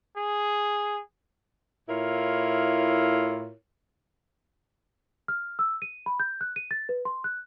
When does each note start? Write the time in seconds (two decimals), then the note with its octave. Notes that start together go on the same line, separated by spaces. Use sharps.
0.17 G#4
1.89 A2 E4 F4 A#4 C#5
5.28 F6
5.59 E6
5.82 D#7
6.06 B5
6.20 G6
6.41 F#6
6.56 D#7
6.71 A6
6.89 B4
7.05 C6
7.24 F#6